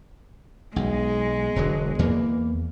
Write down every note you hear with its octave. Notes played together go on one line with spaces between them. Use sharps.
B1 G#3
E1 D3 F#3
E2 E3 A#3